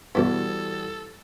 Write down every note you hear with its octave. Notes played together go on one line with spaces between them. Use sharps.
B1 E2 G2 E3 G3 F#4 A4